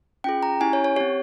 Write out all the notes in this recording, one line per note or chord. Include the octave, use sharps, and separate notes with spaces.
C#4 F4 G#4 G5
A#5
C#4 E4 G4 G#5
C#5
C#5
C4 G4 C#5